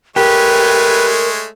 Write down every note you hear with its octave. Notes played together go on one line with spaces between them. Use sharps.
G#3 A3 G4 A#4 B4 C#5